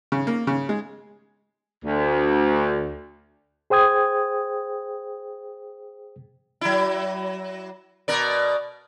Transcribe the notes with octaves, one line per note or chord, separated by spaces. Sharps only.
C#3
A#3
C#3
G#3
D2
G#4 C5 G5 D#6 G#6
F#3 E4
B2 A#4 D5